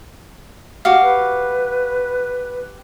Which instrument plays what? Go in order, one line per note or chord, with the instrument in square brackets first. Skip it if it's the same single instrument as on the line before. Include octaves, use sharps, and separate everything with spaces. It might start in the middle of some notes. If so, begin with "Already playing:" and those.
[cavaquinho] F#4 G4 F5
[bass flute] B4